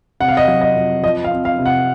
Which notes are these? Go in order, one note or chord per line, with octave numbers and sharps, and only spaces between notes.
C3 F#5
F5
D#5
F5
F#3
D#5
F2
F3 D#5
F5
C4
F5
C3
F#5